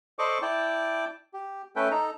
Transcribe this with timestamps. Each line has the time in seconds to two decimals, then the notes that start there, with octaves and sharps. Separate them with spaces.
0.19 A4 C5 D5 D#5 C#6 D6
0.42 E4 D5 G5 A5 D6
1.33 G4
1.76 A3 C#4 A4 B4 G5
1.91 D#4 A4 A#5